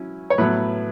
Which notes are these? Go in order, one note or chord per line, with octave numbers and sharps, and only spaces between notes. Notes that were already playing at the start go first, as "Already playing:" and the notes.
Already playing: F#3 C#4 E4
C#5
A2 F#3 B3 B4